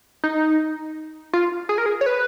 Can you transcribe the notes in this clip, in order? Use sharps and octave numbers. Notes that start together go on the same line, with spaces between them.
D#4
F4
G#4
A#4
G#4
C#5
B4